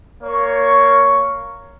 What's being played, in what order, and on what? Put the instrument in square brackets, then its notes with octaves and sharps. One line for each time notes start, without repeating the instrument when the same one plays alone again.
[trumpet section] A#3 C#5 C#6